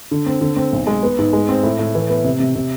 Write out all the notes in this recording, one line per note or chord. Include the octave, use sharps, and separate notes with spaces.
D3
C4
D3
C4
B1
G#3
B3
G#2
G#3
C4
A2
A2
E3
B3
C3
C3
C3